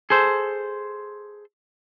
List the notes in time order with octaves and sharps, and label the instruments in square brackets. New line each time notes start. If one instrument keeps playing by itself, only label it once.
[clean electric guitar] G#4 A4 C5